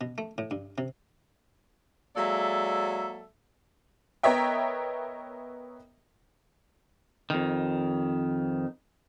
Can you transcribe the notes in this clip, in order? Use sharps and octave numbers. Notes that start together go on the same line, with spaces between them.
B2
A3
A2
G2
C3
F#3 G#3 A#3 A4 D5 E5
B3 A#4 C#5 D#5 E5 G5
F2 D#3